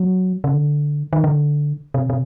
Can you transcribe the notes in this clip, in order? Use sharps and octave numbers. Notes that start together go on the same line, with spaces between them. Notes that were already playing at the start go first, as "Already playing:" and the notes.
Already playing: F#3
C#3
D3
D#3
D3
C3
C3